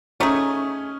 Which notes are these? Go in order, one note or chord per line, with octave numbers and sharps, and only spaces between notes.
A3 C#4 D#4 G#4